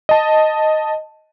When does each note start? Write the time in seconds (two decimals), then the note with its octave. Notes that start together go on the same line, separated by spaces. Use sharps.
0.09 D#5 A5